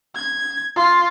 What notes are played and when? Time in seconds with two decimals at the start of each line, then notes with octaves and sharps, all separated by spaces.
0.15 G#6
0.76 F4